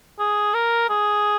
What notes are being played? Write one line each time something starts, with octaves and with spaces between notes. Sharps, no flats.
G#4
A#4
G#4